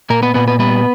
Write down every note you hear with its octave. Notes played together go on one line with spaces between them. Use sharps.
A#2 A#3 A#4
B3 B4
A#2 B3 B4
B3 B4
G3 B3 B4